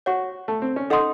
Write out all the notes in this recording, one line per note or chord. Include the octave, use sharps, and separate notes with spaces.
F#4 C#5 F#5 C#6
A3
C4
C#4
D#4 A4 D#5 F#5 C6 D#6